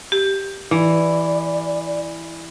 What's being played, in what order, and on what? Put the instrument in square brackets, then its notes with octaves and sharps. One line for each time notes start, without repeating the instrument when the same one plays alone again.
[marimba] G4
[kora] E3 [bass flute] D5